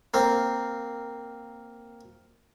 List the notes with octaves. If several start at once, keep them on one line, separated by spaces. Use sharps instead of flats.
A#3 C4